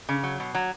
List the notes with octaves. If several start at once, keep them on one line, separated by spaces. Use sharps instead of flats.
C#3
F#3
B2
F#3